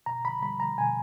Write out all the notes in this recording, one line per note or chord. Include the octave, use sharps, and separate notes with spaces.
B2 A#5
B5
G3 B5
A#5
B2 G#5